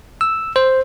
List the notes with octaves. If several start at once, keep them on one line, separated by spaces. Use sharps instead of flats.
E6
C5